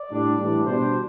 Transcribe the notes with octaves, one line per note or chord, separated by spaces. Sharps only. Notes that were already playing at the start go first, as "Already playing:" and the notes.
Already playing: D5
A2 G3 D4
A2 E3 G3 D4
B2 G3 D4 C5